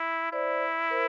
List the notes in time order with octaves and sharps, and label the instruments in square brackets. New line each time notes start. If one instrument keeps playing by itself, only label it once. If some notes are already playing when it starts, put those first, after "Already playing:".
Already playing: [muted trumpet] E4
[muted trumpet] E4 [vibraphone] C5 D5
[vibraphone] A#4 C5